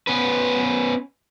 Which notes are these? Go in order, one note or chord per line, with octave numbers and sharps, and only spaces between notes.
B3 C#4 B4